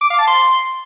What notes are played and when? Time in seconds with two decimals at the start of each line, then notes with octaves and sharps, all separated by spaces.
0.01 D6
0.10 F5
0.19 A5
0.28 C6